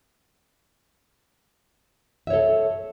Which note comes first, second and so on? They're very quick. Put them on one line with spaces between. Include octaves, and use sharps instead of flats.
E5 C#5 A4